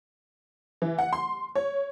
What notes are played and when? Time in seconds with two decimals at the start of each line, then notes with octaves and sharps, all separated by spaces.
0.82 E3
0.99 F#5
1.13 C6
1.55 C#5